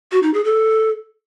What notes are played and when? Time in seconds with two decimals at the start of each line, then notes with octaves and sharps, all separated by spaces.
0.12 F#4
0.23 D#4
0.34 G#4
0.45 A4